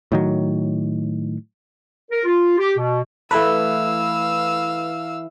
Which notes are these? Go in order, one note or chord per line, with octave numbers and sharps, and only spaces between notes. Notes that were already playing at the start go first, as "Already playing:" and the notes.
A2 D#3 F#3
A#4
F4
G4
B2
E3 A3 E4 A4 B4 F5 E6